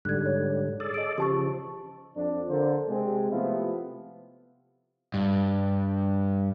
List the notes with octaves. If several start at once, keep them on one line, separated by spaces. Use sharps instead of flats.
G#2 D3 G3 F#6 G#6
C#5
G#4 A4 D5
D#5 D7
C#3 F3 G4 A5 C#6
F2 D4
D3 A#3 C5
C3 G#3 C4
C3 F3 A3 B3 E4 F4
G2